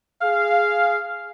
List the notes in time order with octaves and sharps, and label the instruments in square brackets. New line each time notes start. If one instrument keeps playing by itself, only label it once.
[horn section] G#4 F5